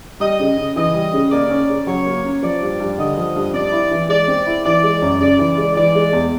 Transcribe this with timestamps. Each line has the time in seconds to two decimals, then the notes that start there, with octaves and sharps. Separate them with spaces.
0.20 G3 D#5
0.40 C#3
0.57 C#3
0.76 E3 D#5
0.94 G3
1.13 C#3
1.32 A#3 D5
1.50 C#4
1.69 C#3
1.87 F#3 C#5
2.06 A#3
2.24 C#4
2.43 F3 D5
2.62 G2
2.80 G2
2.98 D3 D#5
3.17 F3
3.36 G2
3.53 C4 D5
3.72 E4
3.91 E3
4.09 G#3 D5
4.28 C4
4.46 E4
4.65 E3 D5
4.83 G#3
5.02 F#2
5.21 C#3 D5
5.39 E3
5.58 G#3
5.76 E3 D5
5.95 G#3
6.13 E2